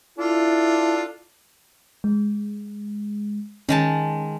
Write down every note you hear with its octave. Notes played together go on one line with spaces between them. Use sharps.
D4 E4 F4 A4
G#3
D#3 G#3 C#4 A5